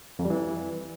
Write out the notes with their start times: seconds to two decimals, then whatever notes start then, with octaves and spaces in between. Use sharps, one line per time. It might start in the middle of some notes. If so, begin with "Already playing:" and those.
0.19 F2
0.25 G3
0.30 E3